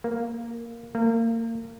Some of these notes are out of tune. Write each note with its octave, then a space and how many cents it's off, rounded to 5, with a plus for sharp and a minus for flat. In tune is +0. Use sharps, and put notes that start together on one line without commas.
A#3 +0
A#3 -30